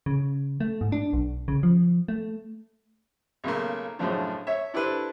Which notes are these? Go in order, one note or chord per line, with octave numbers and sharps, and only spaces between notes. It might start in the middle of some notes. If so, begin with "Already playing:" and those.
C#3
A3
G#2
D4
B1
C#3
F3
A3
B1 C#3 A3 A#3
F#2 A2 C#3 F3 F#3 D4
C#5 E5
D4 E4 G4 A4 B4 C5